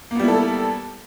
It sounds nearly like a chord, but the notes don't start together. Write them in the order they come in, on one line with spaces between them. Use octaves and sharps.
A#3 B3 G3 E4 A4